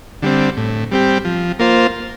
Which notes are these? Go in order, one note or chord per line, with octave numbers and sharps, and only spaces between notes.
D3 G3 C4
A2
G3 C4 G4
F3
A#3 F4 C5